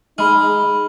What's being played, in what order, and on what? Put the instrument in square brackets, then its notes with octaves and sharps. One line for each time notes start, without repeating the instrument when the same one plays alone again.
[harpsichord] G#3 [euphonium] D#4 [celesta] B5 F6